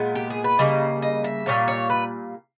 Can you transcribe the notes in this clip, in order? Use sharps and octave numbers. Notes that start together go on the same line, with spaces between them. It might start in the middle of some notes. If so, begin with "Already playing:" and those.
Already playing: A#2 G#3 B3
G4
G#4
B4
C#3 G3 A#3 D#5
D#5
E5
A#2 G3 A#3 C#5
C#5
B4